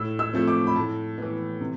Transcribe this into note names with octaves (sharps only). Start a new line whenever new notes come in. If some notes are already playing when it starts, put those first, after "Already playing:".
Already playing: A2 E6
E6
F3 A3 C4
D6
B5
A2 A5
E3 B3
C3